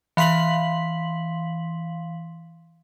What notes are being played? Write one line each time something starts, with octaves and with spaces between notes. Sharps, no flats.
E3 F5 C6 B6 F#7